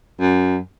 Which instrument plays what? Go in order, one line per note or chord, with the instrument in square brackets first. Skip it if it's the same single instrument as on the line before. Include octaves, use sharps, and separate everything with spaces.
[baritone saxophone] F#2